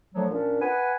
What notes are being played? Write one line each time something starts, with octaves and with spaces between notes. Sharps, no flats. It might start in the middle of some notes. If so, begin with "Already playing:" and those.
D3 F3 F#3 A3
A#2 C#4 D4
B4 F#5 G#5